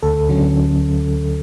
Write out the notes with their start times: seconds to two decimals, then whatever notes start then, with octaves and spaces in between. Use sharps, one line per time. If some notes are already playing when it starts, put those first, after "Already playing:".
0.02 D2 A4
0.29 D3 F#3 C#4